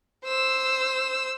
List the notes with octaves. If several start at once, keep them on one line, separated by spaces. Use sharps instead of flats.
C5 E6